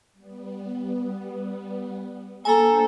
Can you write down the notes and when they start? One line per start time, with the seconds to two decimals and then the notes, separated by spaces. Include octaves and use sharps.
0.12 G3 B3
2.45 A#3 D4 A4 C5 G#5 A#5